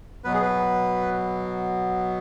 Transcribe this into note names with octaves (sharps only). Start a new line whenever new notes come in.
B2 F#3 B3 B4
G#4
B4